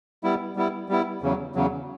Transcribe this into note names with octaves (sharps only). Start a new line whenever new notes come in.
G3 B3 E4
G3 B3 E4
G3 B3 E4
E2 C#3 F#3
E2 C#3 F#3